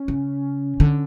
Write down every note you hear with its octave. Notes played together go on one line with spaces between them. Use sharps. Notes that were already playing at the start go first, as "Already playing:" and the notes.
Already playing: C#4
C#3
D3